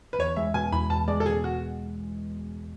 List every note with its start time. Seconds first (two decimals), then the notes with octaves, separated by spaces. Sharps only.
0.13 B4
0.19 E2 C#5
0.36 G#3 E5
0.54 B2 G#5
0.72 E2 B5
0.90 E2 A5
1.08 G#3 D5
1.20 A4
1.26 B2 G#4
1.44 F#4